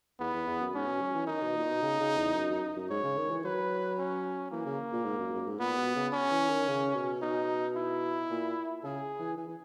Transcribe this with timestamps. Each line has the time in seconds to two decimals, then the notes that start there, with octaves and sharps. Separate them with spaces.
0.20 E2 B3
0.33 E2
0.47 E2
0.61 F#2
0.74 G#2 C#4
0.87 B2
1.01 F#3
1.14 E3
1.27 D#3 D#4
1.42 B2
1.55 A#2
1.69 B2
1.82 C#3
2.00 C#3
2.18 E2
2.35 F#2
2.50 F#2
2.76 F#2
2.90 G#2 C#5
3.03 C#3
3.18 D#3
3.31 E3
3.44 F#3 B4
3.98 C#4
4.52 E3 A#3
4.66 C#3
4.92 A#2
5.05 G#2
5.19 F#2
5.33 F#2
5.47 G#2
5.59 A#2 B3
5.77 B2
5.95 C#3
6.14 C#4
6.31 E3
6.50 D#3
6.67 C#3
6.94 B2
7.22 B2 D#4
7.76 E4
8.30 A#2
8.84 C#3 G#4
9.20 E3
9.37 E3
9.48 E3